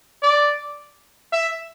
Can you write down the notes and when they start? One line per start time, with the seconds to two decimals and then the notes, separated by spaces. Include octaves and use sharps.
0.23 D5
1.32 E5